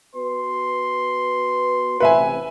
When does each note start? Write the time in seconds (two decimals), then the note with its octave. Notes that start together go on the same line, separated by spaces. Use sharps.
0.15 B3 F#4 B4 C6
2.00 A1 C3 B4 E5 G#5